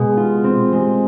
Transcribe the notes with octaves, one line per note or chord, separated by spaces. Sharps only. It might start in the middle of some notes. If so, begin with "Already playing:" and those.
Already playing: B2 G#3
F4
C4
G#3